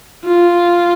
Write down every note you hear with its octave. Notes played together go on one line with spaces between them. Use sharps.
F4